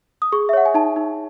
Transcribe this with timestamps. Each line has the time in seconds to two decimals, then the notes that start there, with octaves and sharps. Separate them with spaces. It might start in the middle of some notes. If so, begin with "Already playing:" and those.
0.22 D#6
0.32 G#4 C#6
0.49 E5
0.53 C#5 F#5
0.66 G#5
0.74 D#4 A5
0.96 D#4